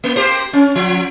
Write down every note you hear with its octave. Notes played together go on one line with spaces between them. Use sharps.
A#3
A#3 G4 C5
C#4
F3